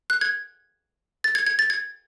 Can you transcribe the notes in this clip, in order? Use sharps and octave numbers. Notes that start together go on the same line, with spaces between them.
F#6
G#6
A6
G#6
G#6
A6
G#6